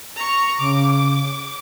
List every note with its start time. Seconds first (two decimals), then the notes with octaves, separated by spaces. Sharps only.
0.16 A#5 C#6
0.59 C#3 D6